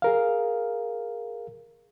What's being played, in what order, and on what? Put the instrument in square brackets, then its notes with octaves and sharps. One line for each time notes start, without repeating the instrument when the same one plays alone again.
[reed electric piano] G#4 A#4 F5